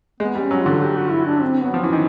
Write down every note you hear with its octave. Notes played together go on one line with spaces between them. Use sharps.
G#3 B3
G3
C#4
F#3
F4
D3
G4
F#4
E4
D4
C4
F#3 B3
F3
E3 C#4
D#3